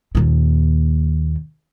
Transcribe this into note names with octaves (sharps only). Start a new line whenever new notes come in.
D#2 A#2